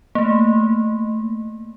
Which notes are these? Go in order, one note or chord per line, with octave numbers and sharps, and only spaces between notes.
A3 A#3